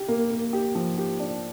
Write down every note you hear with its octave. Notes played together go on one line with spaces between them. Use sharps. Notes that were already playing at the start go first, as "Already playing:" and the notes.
Already playing: G4
A#3
A#3
G4
F3
G4
D4